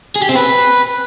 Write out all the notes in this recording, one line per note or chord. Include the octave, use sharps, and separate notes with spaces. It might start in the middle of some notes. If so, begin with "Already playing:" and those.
G#4
G4
C4
B4